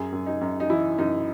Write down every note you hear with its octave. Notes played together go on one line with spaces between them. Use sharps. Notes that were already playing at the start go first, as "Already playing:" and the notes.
Already playing: F#2 G#4
F#2
D#4
F#2
D#4
E3 E4
F#2 D#4